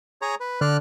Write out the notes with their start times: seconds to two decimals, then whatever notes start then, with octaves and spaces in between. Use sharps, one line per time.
0.22 G#4 C#5 A#5
0.40 B4
0.61 D3 D5 F6 F#6